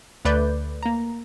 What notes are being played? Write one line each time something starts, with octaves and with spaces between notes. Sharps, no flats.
D2 A3 B4 D5 G6
A#3 A#5